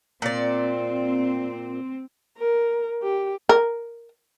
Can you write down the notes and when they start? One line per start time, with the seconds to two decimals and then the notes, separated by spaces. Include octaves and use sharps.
0.22 A#2 C4 D5
2.38 A#4
3.03 G4
3.49 A#4